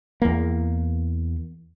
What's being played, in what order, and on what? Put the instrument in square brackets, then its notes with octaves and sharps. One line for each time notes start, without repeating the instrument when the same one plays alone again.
[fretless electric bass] E2 A#3